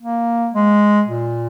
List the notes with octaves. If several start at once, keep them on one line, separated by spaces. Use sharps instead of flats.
A#3
G#3
A#2